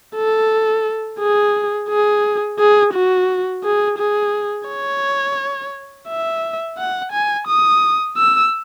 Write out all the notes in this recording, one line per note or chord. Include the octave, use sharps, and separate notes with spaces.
A4
G#4
G#4
G#4
F#4
G#4
G#4
C#5
E5
F#5
G#5
D#6
E6